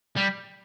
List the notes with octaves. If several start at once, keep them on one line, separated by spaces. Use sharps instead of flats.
G3